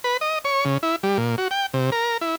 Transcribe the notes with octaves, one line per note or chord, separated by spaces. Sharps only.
B4
D#5
C#5
C#3
E4
G3
A#2
F#4
G5
C3
A#4
E4